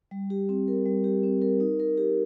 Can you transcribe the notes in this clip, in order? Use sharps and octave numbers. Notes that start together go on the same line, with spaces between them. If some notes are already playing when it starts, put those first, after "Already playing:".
G3
G4
C4
A#4
G3
G4
C4
A#4
D#4
A#4
G4